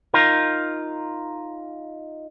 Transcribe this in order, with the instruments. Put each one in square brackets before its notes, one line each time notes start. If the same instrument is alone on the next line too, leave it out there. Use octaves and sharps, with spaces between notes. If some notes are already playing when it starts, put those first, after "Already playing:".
[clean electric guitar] D#4 F4 A#4